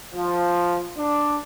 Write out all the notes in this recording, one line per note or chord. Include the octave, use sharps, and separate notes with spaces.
F3
D4